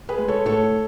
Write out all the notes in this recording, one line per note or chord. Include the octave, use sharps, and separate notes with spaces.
G#4 B4
G#3
A4 C#5
A2 A4 C#5